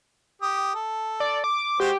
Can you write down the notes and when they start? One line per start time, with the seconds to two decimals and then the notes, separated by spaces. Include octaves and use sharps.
0.42 G4 D#6
0.75 A4
1.20 D5
1.44 D6
1.80 G#3 F#4 G4 C5